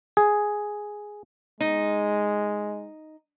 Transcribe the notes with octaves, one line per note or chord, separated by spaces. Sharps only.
G#4
G#3 D#4